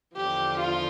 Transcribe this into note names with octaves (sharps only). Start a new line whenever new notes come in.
E2 D3 F3 G4
F4